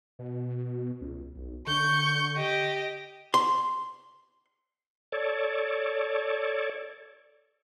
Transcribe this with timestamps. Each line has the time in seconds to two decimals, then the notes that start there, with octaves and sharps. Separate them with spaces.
0.19 B2
1.01 C#2
1.36 B1
1.67 D3 C#6 G6
2.37 G4 D#5
3.34 C6
5.12 A4 C#5 D5